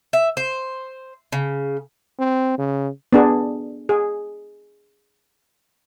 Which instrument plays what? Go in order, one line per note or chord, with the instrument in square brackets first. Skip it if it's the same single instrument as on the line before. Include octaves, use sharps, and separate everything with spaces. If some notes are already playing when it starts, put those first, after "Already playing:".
[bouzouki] E5
C5
C#3
[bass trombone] C4
C#3
[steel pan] B3 D4 G#4
G#4